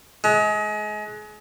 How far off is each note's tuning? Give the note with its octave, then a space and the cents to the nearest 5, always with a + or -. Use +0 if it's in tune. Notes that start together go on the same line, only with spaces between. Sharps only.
G#3 +30